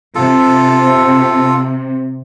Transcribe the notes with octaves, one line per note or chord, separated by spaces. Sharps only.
C3 F4 A4